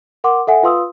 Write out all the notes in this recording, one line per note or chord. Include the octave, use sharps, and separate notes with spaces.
A#4 F#5 C6 D6
A4 E5 F#5 G#5
F4 B4 F5 C6 D#6 E6